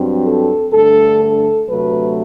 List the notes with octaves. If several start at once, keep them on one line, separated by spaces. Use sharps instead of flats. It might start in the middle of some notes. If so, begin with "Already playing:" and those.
Already playing: G2 F#3 C4
A4
G2 D3 A3 A4
A4
D2 C3 F#3 A3 B4